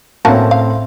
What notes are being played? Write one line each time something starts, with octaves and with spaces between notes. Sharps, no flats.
A2 A#3 C4 C#4 F#4 A5
F5